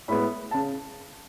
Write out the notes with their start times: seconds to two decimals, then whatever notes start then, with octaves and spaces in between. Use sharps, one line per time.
0.08 A2 G#3 B3 B5
0.51 C#3 A5